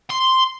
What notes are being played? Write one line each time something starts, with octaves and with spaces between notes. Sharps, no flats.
C6